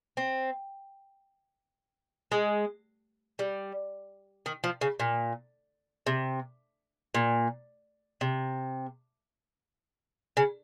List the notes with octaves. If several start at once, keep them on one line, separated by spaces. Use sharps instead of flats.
C4
G#3
G3
D#3
F3
C#3
A#2
C3
A#2
C3
C#3